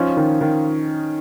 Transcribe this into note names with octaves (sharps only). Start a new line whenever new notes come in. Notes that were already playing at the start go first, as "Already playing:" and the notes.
Already playing: F3 C#4 D#4
D#3
D#3